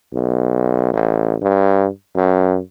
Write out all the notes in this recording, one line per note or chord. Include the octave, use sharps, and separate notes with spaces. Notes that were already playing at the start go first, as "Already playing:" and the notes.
B1
A1
G2
F#2